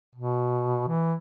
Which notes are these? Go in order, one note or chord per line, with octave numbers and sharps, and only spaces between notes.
B2
E3